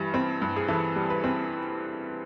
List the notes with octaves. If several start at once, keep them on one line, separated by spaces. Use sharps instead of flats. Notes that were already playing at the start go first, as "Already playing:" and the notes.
Already playing: G2 E3 G3
C4
G2
G#4
E3 A4
G3
B4
C4